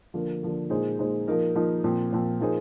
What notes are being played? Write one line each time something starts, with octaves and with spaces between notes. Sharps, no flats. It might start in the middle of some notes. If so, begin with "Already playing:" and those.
D3 F3 A#3
D3 F3 A#3
A#2 G#3 D#4 G#4 C5
A#2 G#3 D#4 G#4 C5
F3 A#3 D#4 A#4
F3 A#3 D#4 A#4
A#2 F3 C4
A#2 F3 C4
F3 A#3 D#4 G#4 C5